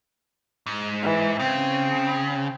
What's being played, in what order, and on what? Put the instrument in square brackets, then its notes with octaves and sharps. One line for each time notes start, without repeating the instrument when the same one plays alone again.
[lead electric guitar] G#2
[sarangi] E3
[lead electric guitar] C#3 [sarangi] C4